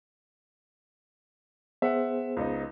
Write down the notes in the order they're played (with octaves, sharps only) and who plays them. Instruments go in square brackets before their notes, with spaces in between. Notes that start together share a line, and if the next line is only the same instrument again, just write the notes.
[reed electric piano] B3 G#4 C5 [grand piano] E5 F#5
[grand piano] C#2 D#4 D#5